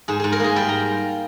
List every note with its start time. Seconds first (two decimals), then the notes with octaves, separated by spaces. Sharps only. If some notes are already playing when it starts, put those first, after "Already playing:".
0.08 G#2 G#4
0.20 G#2 G#4
0.32 A#4
0.40 A#3 G#4
0.56 G3 G5
0.69 A#5